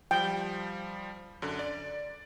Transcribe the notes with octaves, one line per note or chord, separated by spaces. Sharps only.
F3 G3 G5
F#2 D3
D5